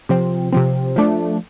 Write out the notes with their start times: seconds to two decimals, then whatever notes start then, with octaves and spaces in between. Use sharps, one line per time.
0.09 C3 F3 C4
0.53 C3 F3 C4
0.96 F3 A3 D4